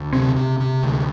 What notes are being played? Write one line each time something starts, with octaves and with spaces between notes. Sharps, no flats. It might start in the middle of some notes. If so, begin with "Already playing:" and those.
Already playing: D2
C3 C4
C3
C3
D2